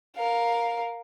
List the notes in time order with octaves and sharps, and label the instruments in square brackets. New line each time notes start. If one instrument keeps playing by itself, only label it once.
[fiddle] A#4 F5